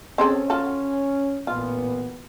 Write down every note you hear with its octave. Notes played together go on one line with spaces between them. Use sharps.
C4 C#4 G#4 A4
F4 F#4 A4
A1 A#2 B3 F4